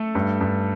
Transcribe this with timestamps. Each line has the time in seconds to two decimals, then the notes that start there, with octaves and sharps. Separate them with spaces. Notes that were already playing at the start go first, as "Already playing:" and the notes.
Already playing: A3 A4
0.15 G2
0.41 G2